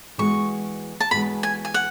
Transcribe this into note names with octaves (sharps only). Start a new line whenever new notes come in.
E3 G#3 B3 F#4 C#6
A5
E3 G#3 B3 F#4 B5
G#5
G#5
F#5